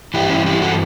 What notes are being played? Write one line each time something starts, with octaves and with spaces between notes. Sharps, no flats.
G2 E3 E4 G4
C#4 E4
E4 G4
F#4 A4